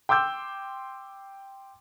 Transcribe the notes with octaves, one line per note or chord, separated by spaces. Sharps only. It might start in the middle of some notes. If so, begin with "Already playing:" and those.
G5 C6 D6 E6 G6